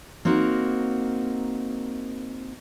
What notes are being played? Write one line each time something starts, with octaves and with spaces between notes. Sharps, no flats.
A#3 C4 D#4 F#4 A#4